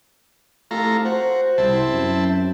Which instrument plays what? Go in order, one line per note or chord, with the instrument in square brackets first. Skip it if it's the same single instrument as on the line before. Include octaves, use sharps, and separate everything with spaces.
[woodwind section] C2 F2 [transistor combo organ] A3 F4 A#5
[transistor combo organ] F#4 [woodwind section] C5
[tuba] C2 [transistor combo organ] C4 E4 A5
[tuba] F#2